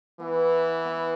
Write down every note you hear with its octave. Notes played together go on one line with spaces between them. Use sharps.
E3 B3
B3